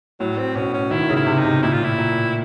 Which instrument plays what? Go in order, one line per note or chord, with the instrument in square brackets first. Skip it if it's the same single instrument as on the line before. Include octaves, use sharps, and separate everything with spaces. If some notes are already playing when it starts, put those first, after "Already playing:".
[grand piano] A2 [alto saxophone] F#3
[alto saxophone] C4
[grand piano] B2 [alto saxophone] C#4
[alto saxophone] C#4
[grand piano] D#3 [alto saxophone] E4
[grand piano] C#3
[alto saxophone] E4
[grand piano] C3
[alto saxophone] D#4
[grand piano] C3
[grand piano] A#2 [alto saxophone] E4
[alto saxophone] F4
[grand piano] A2 [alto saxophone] E4
[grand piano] A#2